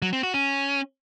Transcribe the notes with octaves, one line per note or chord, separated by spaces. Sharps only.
F#3
C4
F#4
C#4